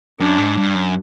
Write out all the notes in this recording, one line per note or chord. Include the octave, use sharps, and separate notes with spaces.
F#2 D4
G#2
G2
F#2